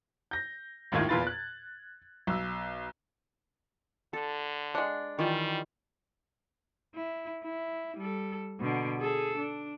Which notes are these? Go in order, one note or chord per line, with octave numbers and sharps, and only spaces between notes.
G6 A#6
G#1 D#2 A2 D#3 F4 G#6
E2 A#2 F4 B4 A6
F#6
B1 E6
D3 A4
G#3 D4 F#5
D#3 E3 G3 F4
E4
E4
G3 A4
B2 D3
G#4 A4
D4